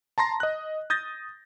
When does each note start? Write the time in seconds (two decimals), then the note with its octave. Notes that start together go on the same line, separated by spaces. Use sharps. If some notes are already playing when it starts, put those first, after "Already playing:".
0.18 A5 A#5 C6 A#6
0.40 D#5 F#6
0.90 D#6 G6 A6 A#6